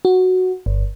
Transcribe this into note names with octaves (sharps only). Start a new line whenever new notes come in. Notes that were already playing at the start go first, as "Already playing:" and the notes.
F#4
G1